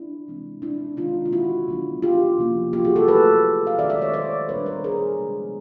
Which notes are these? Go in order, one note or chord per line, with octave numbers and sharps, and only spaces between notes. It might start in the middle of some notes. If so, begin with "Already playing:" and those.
Already playing: D4 E4
C3 E3 G#3 C4
D4 E4
C3 D#3 G#3 D#4 F4
F4
E4 F#4
D3 F#3 B3 D4
F4 G4
C3 F3 A#3 C#4
F4 G4
F#4 G#4
G4 A4
D3 F#3 A3 A4 B4
F5
D#3 G#3 C#4 D5 E5
D5 E5
C#5 D#5
C5 D5
A#2 G3 B3 D4 B4 C#5
A#4 C5
G#4 A#4
C3 F3 G#3 B3 D4